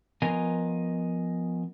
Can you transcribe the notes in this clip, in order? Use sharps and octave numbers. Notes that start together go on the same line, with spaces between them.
F3 B3 A#4 D#5 F5 G#5